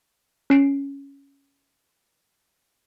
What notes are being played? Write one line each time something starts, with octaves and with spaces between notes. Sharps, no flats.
C#4 C7 D7